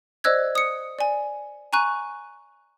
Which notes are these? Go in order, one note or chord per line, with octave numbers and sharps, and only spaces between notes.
C5 D5 D#5 E6 F#6 G#6
D#6 C#7
D5 G#5
G#5 A#5 C#6 F#6 D#7